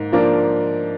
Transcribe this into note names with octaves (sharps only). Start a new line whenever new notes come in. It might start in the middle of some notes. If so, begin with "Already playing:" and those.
Already playing: G#2 A#3
F3 A#3 D4